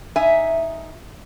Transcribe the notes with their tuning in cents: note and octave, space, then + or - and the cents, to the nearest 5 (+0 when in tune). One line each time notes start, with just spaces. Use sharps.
D#4 +0 E5 +0 G#5 +0